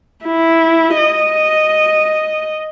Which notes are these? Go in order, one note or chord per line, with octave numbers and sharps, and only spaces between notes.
E4
D#5